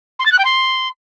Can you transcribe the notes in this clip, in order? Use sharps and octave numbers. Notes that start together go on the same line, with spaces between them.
C6
A6
F#6
G5
C6